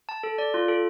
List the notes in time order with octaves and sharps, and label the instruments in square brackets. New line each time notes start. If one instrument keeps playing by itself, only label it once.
[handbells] A5
A4
D5
F4
A4